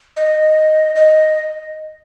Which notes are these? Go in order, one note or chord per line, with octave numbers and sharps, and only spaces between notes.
D#5
D#5